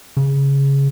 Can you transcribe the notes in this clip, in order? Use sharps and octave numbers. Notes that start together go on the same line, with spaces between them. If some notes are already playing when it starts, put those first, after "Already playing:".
C#3